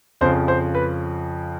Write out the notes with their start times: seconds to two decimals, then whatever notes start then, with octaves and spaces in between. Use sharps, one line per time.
0.21 F2 C#3 F3 C5
0.48 C5
0.75 B4